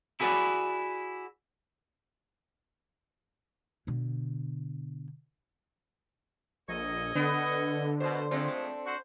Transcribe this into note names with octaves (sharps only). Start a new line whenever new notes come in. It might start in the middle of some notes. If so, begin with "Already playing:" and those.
E4 F#4 G#4 B4 D5
B2 D3
A#1 A4 C#5 D#5
D3 B3
B2 C5
F3 G#3 A3 C4 D4 A4
F#4 C5